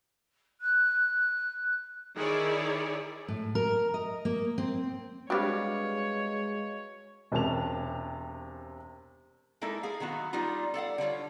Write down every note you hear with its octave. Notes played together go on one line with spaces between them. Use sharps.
F#6
D#3 E4 G#4 C#5 D5
A2
A#4
D#5
A#3
C4
G3 G#3 C4 D4 F#4 B4 C#5 F5
E1 C3 C#4 A5 F7
G#3 A#3 D#4 E4 A4
G#4 F5
D#3 F#3 B3 F#4
G3 B3 D#4 F4
A4 D5 F5 F#5
D3 G3 F4 C#5